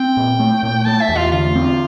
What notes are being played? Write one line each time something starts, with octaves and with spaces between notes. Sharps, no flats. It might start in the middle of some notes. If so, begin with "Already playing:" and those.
Already playing: C4 G5
A#2
A3
A#2
A3 A5
E5
E2
F4
D3 F4
C4